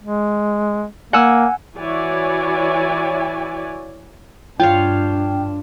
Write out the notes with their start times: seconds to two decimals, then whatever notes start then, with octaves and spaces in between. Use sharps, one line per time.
0.02 G#3
1.13 A#3 F#5 G#5 E6
1.78 E3 E4 F#4 C#5 D5 G#5
4.60 G2 D4 F4 C#5 F5 G5